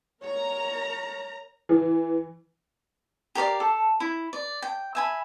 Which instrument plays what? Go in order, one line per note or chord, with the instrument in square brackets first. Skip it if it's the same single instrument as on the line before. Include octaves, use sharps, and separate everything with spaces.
[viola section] A#4 A#5 [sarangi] C#5
[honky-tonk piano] E3
[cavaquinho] G4 A#4 D5 F5
A4
E4
D5
G5
E5 G#5 B5